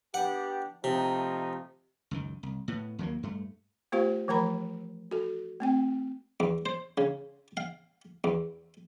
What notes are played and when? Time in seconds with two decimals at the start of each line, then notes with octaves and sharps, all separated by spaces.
0.14 B3 D4 G4 F#5
0.84 C3 F3 A3 D#4
2.11 C#2 F#2 D#3
2.43 C2
2.68 A2 B3
2.99 D#2 F#3 A#3
3.23 G2 A3
3.92 A3 B3 F4 G4 C5 F5
4.28 E3 F3 A3 A#4 A#5 B5
5.11 F#4 A4
5.60 A3 C4 G5
6.40 E2
6.66 C5
6.98 C#3
7.57 F5
8.24 E2